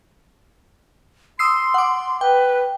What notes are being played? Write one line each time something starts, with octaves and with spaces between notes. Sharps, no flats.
C6 D#6 E6 C7
F#5 D6
B4 G5